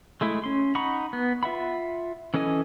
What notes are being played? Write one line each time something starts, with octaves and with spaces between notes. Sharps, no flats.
G#3 A3 E4
C#4 C6
D#4 F#5 A#5 B5 C#6
B3
F4 E5 F#5 B5
E3 C#4 A4 D#5 G#5